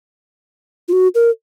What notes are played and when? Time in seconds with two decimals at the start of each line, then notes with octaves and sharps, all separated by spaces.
0.88 F4
0.93 F#4
1.15 A#4